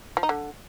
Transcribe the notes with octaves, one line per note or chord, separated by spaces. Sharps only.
F3
D#4
D3